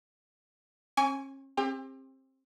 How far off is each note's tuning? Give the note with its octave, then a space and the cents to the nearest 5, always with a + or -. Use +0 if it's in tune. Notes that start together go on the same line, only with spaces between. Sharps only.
C#4 -40 G#5 +0 C#6 +40
C4 +25 G4 +40